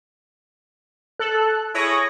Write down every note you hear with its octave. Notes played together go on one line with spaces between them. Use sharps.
A4 F#6
E4 G#4 C#5 D#6 A#6